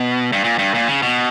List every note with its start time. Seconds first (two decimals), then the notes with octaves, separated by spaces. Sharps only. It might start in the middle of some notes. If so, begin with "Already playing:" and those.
Already playing: B2
0.33 G2
0.44 A#2
0.59 G2
0.74 A#2
0.88 C#3
1.02 B2